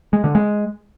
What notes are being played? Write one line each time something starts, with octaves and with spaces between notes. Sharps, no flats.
G#3
D3
G#3